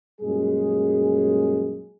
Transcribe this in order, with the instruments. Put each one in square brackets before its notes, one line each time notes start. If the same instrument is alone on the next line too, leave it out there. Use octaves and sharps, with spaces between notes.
[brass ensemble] F#2 A#2 G3 G#3 G#4